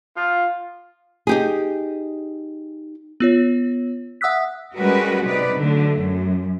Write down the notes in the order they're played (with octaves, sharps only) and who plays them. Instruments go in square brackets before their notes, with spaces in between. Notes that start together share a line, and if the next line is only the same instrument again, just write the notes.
[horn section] F4
[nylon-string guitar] D#4 G4 G#4
[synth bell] B3 F4 C#5
E5 F#5 D#6 E6 F#6 B6
[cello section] G3 G#3 C#4 F#4 A#4 B4
C3 D#4 B4 D5
D3 F#3 A3
F#2